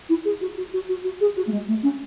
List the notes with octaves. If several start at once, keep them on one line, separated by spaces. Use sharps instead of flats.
E4
G#4
F#4
F#4
F#4
F#4
F#4
G#4
F#4
A3
G#3
A3
C#4